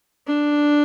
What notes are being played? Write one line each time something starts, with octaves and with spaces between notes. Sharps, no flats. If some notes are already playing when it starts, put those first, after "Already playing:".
D4